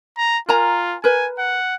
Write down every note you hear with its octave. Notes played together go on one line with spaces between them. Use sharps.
A#5
F4 A#4 G#5 A#5
A#4 B4 G#5
F#5